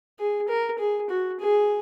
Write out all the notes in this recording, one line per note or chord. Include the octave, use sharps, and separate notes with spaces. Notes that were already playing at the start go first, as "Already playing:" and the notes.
G#4
A#4
G#4
F#4
G#4